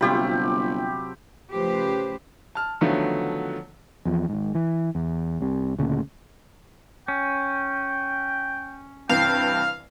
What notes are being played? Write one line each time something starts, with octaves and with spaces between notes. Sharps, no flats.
G1 C3 F#3 A3 C4 F4 G4 B5
C#3 F3 A3 G4 B4 C5
A5 F6
D3 D#3 F3 F#3 A3 B3
E2 F3
G#1 G#2
E3
E2
C2 C3
D2 A#2 C#3
C#4 G5
G2 C3 E3 F5 G5